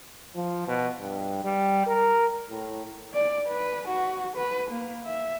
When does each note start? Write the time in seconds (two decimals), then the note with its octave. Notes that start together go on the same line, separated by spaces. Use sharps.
0.35 F3
0.68 B2
1.00 G2
1.44 G3
1.87 A#4
2.50 A2
3.14 D5
3.48 B4
3.88 F#4
4.36 B4
4.70 A#3
5.05 E5